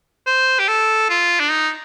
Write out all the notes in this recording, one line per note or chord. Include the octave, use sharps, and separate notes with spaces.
C5
G4
A4
F4
D4
D#4